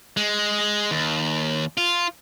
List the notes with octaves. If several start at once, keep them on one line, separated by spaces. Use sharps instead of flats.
G#3
D#2
F4